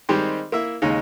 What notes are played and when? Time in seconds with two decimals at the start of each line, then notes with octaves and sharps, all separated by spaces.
0.09 D#3 G3 G#3 C4 G4 C5
0.52 A#3 E4 E5
0.82 D#2 C#3 G#3 D#4